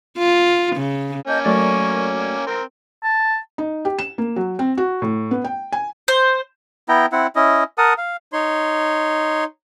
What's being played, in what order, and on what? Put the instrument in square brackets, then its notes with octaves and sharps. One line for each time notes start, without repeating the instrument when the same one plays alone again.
[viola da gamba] F4
C#3
[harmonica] A#3 C#4 [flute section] D#5 A5 G6
[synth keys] F#3 A3 D5 [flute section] A#4 G#5 C#6
[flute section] G5
[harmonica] C4 A#4 [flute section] A#5
[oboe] A5
[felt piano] D#4
G4
E7
A#3
F#3
C4
F#4
A2
B3
G5
G#5
[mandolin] C5
[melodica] B3 E4 G5 A#5
C4 E4 F#5
C#4 E4 D#5
A#4 F#5 A5 D#6
F5
[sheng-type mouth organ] D#4 C#5 C6